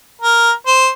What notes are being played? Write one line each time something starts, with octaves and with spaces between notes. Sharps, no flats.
A#4
C5